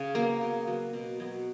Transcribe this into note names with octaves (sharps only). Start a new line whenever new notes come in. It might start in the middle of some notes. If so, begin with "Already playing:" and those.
Already playing: C#3
F#3 A#3 B3 A#4
C#3
F#3 B3
B2
F#3 B3